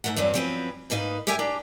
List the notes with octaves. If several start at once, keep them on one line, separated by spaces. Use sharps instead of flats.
G#2 D#3 A3 A#4 F#5
E2 G2 F#3 C4 C#4
F3 F#3 C4 C#4 A#4 B4
G#2 A#3 D#4 B4 F5
G4 A#4 C#5 E5 G5 G#5
D4 G4 A#5